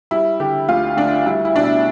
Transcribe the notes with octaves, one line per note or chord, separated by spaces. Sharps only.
G3 E4
D3 G4
D2 F4
D2 D4
G3 E4
E4
B2 D4
E4